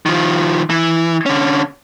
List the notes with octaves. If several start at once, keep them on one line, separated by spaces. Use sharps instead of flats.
D#3 F3
E3
D3 C#4